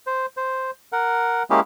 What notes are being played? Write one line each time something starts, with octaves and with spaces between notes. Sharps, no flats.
C5
C5
A#4 F#5
G#3 A#3 C#4 E4 G4 G#4